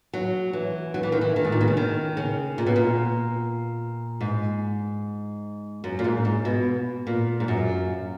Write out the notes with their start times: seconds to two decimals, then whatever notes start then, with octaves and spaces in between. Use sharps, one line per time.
0.13 F#3
0.53 E3
0.94 F#3
1.03 E3
1.12 D#3
1.21 E3
1.36 D#3
1.45 G#2
1.52 A#2
1.61 B2
1.68 C#3
1.77 D#3
2.17 C#3
2.58 A#2
2.67 B2
2.76 A#2
4.21 G#2
5.84 F#2
5.99 A#2
6.04 G#2
6.25 G#2
6.45 B2
7.07 A#2
7.40 G#2
7.48 F#2